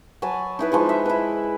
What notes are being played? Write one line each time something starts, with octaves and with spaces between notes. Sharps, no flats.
F#3 G#5 A5 B5
D#4 E4 B4
F3 G#3 B4 C#6
E5
E4 B4